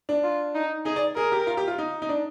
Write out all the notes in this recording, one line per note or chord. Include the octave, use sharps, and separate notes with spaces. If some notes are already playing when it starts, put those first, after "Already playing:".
D4
F4
D#4
D#4 G#4
D5
G#4 A#4
G4
F4
G4
F4
D#4
D#4
D4